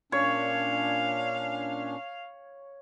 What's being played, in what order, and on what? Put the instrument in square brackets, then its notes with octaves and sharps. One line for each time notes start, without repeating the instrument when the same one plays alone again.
[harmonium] A#2 C#4 D4 [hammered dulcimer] C#5 [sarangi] F5